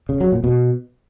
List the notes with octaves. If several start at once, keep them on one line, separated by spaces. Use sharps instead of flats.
C#3
F#3
A#2
B2